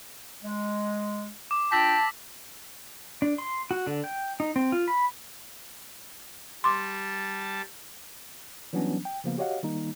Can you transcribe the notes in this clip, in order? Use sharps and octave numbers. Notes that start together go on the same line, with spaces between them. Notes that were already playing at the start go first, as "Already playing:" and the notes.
G#3
D6
D4 F4 G5 A5 E6 A#6 B6
D4
C6
F#4
D3
G5
D#4
C4
F4
B5
G3 A5 C6 D6
E3 F#3 G3 B3 C#4 D4
G5
C#3 F3 A#3 B3
F#4 G4 C#5 D#5 F5 F#5
D#3 G3 A#3 D#4